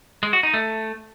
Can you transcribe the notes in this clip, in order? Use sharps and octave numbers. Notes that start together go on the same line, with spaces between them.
G#3
F#4
D#4
A3